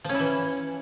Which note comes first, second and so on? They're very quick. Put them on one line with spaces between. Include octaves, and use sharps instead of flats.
F3 C#4 E4 E3